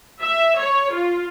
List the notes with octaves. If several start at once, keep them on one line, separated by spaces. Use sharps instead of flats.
E5
C#5
F4